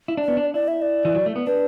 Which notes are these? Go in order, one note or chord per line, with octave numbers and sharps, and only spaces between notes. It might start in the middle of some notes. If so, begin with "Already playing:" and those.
E4
D4
B3 D5
D4
E4 D5
E5
D5
E3
F#3
A3
B3
D4 B4